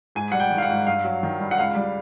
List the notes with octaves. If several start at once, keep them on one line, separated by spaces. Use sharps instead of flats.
G#2 G#5
G3 F#5
G5
D#3
F5
F#5
G#2
G2 F5
F#3
D#3
G2
F#5
C#2 F5
G3